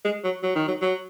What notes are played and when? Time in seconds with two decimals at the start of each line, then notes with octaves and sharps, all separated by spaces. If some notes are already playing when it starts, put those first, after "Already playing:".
0.05 G#3
0.25 F#3
0.43 F#3
0.56 D#3
0.68 F#3
0.82 F#3